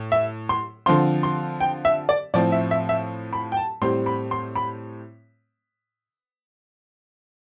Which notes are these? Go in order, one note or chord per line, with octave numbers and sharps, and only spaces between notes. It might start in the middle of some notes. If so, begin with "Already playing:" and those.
Already playing: A2
E5
C6
D3 F3 C4 F4 C6
C6
G5
E5
D5
A2 F3 C4 D5
E5
E5
E5
B5
G5
A5
A2 G3 C4 C6
B5
C6
B5